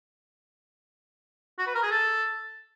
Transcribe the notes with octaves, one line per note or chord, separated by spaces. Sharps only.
F#4
B4
A#4
G#4
A4